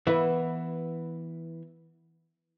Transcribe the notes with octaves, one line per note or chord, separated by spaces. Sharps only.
E3 B3 E4